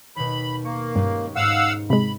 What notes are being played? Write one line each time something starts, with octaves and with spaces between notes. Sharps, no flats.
D#2 B2 B5
A#3 C#6
G2 G#3 C#4 G4
G#2 F5 F#5 E6
C3 G#3 B5